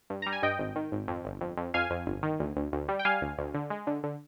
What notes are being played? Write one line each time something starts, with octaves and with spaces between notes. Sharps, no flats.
G2
G3 A#5
G#5
G2 D#5 G5
G#1
D#3
G#1
F2
G1
F2
F2
F2 F5 G#5
F2
G1
D#3
D2
D2
D2
G3
G5
G3 F5 G#5
D2
D2
D3
G#3
D3
D3